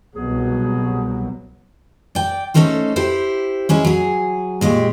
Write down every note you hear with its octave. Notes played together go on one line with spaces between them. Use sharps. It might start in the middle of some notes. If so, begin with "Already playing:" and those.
C2 B2 F#3 G#4
D5 G5
A3 A#3 C#4 D#4 A4 C5
E4 G4 C5
G#3 C#4 E4
F#3 G#4
A#2 G#3 G4 C#5